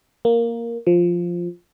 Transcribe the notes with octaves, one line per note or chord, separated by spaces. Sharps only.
A#3
F3